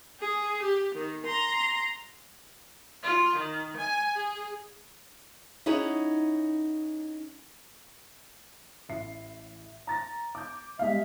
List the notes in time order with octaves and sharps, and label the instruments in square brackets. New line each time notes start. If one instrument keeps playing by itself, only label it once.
[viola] G#4
G4
D#3
A#5 C6
F4
D#3
G#5
G#4
[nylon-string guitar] C#4 D#4 E4 F#4 G#4 C#5
[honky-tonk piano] A1 E4 C7
A#5 A6 A#6
D6 G6
[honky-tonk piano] G3 G#3 F5 [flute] E5